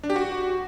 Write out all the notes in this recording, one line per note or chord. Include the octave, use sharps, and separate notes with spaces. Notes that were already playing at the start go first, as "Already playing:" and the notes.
D4
G4
F#4